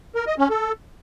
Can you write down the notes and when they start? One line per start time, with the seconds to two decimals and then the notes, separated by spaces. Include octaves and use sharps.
0.15 A#4
0.27 D#5
0.38 C#4
0.50 A4